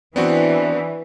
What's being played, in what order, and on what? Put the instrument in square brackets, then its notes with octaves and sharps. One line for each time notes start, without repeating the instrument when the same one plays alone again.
[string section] E3 [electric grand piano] B3 C4 F#4 [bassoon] D4